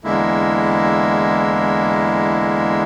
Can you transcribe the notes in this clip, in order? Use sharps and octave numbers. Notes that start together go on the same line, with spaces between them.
E2 D3 G#3 A#3 E4